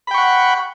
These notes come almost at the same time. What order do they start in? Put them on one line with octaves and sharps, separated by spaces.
B5 G5 C#6 F#5